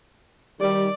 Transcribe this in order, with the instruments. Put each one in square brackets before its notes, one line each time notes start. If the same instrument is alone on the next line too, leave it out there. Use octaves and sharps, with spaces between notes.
[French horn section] D#3 G3 [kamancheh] D5